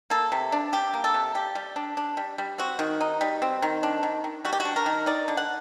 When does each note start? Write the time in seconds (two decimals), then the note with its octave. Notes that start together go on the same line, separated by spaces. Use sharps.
0.10 A#3 A4
0.32 C3
0.52 D4
0.72 G3 G4
0.94 A#3
1.04 A4
1.14 C3
1.35 G3 G4
1.55 G3
1.76 D4
1.97 D4
2.17 G3
2.38 G3
2.58 C4 F#4
2.79 D#3
3.01 D#4
3.21 G3
3.42 C4
3.62 D#3
3.83 D4
4.03 D#3
4.24 D#3
4.45 G3 F#4
4.53 G4
4.60 F#4
4.65 D4
4.76 A#4
4.86 D#3
5.06 D#4 D5
5.28 D3
5.37 F#5